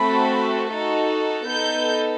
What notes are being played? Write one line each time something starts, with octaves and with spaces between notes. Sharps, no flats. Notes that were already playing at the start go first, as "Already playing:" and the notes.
Already playing: A3 C4 F#4 A4 B5
D#4 F#4 A4
B3 D#4 A4 G6